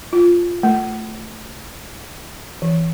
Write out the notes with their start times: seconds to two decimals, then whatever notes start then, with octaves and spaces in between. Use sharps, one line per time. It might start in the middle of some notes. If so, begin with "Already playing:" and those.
0.13 F4
0.63 A3
2.62 E3